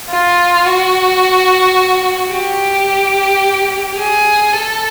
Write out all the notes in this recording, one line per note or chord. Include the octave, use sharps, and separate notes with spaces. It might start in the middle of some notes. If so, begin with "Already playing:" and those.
F4
F#4
G4
G#4
A4